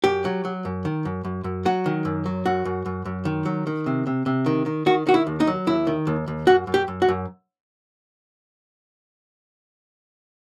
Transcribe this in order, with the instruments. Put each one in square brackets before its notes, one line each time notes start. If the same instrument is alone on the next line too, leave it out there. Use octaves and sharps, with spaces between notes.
[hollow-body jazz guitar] F#2 G4
F#3
F#3
F#2
D#3
F#2
F#2
F#2
F#3 F#4
D#3
F#2
F#3
F#2 F#4
F#2
F#2
F#2
D#3
F#3
D#3
C3
C3
C3
D#3
D#3
D#3 F#4
D#3 F#4
E4
D#2
D#4
F#3
D#2 E4
D#3
D#2
D#2
F#2 F#4
F#2
G4
F#2
F#4
F#2